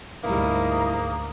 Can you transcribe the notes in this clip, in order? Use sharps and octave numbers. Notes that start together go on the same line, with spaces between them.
D2 G#2 G3 A#3 D#4 E4 A#5 D#6